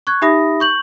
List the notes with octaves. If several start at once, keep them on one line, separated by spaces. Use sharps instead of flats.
C#6 F#6 G#6
D#4 G4 E5 B5 D#6 A#6
C#6 G6 F#7